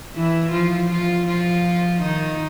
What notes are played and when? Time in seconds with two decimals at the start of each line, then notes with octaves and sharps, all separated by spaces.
0.15 E3 E4
0.52 F3 F4
0.89 F3 F4
1.27 F3 F4
2.02 D#3 D#4